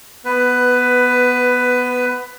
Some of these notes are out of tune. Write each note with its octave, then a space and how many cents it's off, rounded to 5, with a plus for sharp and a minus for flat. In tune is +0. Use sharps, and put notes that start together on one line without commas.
B3 +0 B4 +15